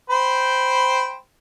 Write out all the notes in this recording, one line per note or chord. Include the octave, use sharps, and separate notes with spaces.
C5 G5 B5